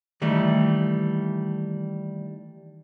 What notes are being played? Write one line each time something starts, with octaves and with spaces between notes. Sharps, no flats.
D#3 E3 G3 A3